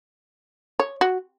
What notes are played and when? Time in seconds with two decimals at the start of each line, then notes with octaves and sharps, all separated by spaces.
0.80 C#5
1.01 F#4